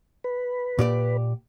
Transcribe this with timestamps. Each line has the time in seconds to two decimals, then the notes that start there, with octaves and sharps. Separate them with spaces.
0.24 B4
0.79 A#2 G4 D5